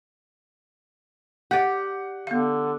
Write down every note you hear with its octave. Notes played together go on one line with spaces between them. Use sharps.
G4 D5 F#5
D3 B3 F5